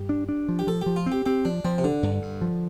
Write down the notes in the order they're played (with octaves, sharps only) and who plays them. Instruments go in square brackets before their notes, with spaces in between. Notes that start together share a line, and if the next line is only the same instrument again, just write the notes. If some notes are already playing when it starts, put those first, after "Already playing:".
Already playing: [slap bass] G2 [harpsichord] G4
[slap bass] D4
D4
F3
[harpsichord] G4
[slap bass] F3 [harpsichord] A4
[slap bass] F3 [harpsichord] G4
[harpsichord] F4
[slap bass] C4
[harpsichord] G4
[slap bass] C4 [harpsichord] G4
[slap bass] F3 [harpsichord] D4
[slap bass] F3 [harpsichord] C4
[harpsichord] C3
[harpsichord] D3 [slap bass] D4
[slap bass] G2
G2
F3